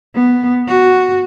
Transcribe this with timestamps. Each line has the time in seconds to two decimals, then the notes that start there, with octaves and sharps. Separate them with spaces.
0.15 B3
0.68 F#4